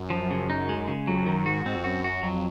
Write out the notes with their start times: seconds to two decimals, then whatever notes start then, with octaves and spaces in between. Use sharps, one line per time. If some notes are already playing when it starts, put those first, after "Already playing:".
Already playing: F#2
0.10 F3
0.31 C#3
0.50 D#4
0.69 G#3
0.88 C#3
1.07 F2 F#3
1.26 F#2 D#3
1.46 G#2 F#4
1.66 G#2 C4
1.76 F2
1.84 F#2 F#4
2.04 F#4
2.23 F2 F#3